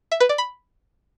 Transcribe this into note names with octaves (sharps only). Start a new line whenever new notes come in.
E5
B4
D5
B5